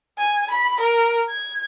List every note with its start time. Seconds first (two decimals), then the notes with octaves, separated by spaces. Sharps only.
0.18 G#5
0.51 B5
0.81 A#4
1.29 G#6